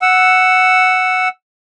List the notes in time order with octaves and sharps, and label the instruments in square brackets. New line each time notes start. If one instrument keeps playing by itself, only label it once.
[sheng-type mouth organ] F#5 E6